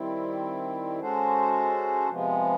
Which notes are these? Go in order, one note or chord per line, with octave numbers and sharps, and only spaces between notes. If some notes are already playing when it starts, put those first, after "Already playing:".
Already playing: D#3 G3 C4 E4
G#3 C#4 F#4 A4 C5
C3 F3 G#3 B3